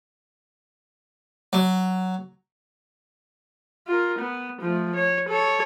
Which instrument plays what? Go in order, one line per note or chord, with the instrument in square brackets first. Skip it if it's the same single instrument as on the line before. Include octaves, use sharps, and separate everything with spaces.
[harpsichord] F#3
[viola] F4 A#4
B3
F3 A3
C#5
A4 C#5